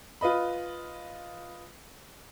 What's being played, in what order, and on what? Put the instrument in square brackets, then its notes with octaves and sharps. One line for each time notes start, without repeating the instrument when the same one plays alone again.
[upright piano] F4 B4 D#5 B5